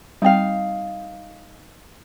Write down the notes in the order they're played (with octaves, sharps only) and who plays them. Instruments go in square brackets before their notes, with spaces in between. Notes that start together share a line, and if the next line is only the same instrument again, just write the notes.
[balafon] G3 C4 G5 [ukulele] D#4 F5